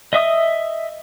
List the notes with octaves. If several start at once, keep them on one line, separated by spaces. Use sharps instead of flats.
D#5 E5 D#6